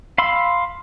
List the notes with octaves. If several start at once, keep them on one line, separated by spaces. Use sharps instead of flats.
F5 B5 C6 E6